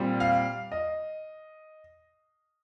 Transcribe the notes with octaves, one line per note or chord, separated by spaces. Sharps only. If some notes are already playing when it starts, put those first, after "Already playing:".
Already playing: A#2 G3 C4
F5
D#5